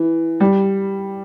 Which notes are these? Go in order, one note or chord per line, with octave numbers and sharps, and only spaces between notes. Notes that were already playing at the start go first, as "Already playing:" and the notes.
Already playing: E3
G3